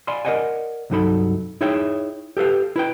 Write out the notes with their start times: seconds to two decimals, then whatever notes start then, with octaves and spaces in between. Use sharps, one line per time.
0.07 D5 F5 G#5 B5 C6
0.25 A#4 C5 D5 D#5 F#5 G#5
0.90 C2 G2 F#3 D#4 A4 B5
1.61 D#4 E4 G#4 C#5 E5 G5
2.37 G4 A4 B4 F5
2.76 E4 B4 G5